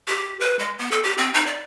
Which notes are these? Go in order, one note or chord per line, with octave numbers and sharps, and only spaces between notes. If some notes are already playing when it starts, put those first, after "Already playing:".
G4
B4
G#3
B3
A4
G4
C4
D#4
D5